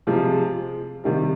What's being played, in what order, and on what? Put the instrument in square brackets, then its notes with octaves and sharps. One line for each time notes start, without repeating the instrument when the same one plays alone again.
[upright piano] C3 F3 G#3
C3 D#3 G3